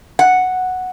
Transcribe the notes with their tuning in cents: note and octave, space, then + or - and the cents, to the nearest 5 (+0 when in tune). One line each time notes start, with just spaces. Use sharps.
F#5 -5